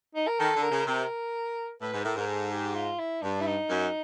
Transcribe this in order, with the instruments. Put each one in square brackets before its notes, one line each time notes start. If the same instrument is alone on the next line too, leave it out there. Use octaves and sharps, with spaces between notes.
[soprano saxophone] D#4
A#4
[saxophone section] D#3 [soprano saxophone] A4
[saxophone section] D3
[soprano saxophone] A#4
[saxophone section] C#3
[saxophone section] C3 [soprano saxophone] A#4
[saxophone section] A2 [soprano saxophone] B4
[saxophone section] G#2
[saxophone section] A2 [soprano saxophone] A#4
[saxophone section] G#2 [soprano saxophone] A#4
[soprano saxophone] A4
G4
F4
E4
[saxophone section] G2 [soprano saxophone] D4
[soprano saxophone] E4
D#4
[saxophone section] F#2